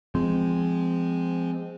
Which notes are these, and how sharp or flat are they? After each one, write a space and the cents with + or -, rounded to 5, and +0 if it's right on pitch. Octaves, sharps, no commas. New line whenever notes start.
F3 -10 G#3 +0 C4 -15